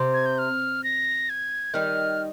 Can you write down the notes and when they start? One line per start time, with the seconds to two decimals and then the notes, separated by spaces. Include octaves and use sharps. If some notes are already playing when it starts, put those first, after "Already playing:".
Already playing: C3
0.14 G#6
0.26 G6
0.38 F6
0.84 A#6
1.29 G#6
1.74 D#3 G3 F6